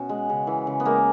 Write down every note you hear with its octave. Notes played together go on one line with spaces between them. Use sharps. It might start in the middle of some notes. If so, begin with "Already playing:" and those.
Already playing: B2 C#4 F#4
G#3
C#3
E3
C#3
B3
G#3 A#3